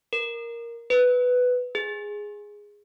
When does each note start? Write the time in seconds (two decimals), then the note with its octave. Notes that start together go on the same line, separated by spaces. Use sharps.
0.13 A#4
0.90 B4
1.75 G#4